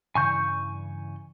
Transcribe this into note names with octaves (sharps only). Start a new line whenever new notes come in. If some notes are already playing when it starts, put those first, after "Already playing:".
G2 C#3 E3 G#5 C#6 G6